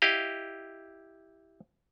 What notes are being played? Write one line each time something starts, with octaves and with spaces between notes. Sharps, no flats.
E4 G4 D#5 F5